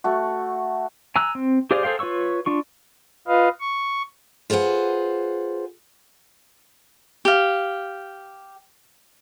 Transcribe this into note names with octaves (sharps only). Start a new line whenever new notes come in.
A3 F#4
G#5 A#5 E6 F#6
C4
G4 G#4 C5 D5 F5
G#4 A4 C5 F5 G5
F4 B4 C#5 C#6 E6
D4 F4 C#6
F4 B4 D#5 F5
C#6
F4 G#4 B4 C5 F#5
G4 F5